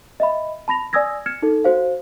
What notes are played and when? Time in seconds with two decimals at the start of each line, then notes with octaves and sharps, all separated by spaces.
0.20 D#5 E5 B5
0.68 A5 B5 A#6 F7
0.93 D5 G#5 D#6 E6 G#6 A#6
1.26 F6 G#6 C#7 E7
1.42 D#4 A4
1.64 F#4 C5 F5